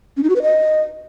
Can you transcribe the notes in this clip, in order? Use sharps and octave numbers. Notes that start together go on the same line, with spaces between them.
C#4
D#4
F#4
B4
D#5